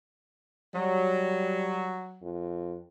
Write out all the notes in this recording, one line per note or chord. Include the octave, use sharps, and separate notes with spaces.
F#3 G3
F2